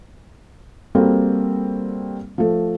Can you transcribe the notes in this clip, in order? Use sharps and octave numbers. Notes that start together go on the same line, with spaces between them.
G3 A#3 C4 F#4 A4
F3 A3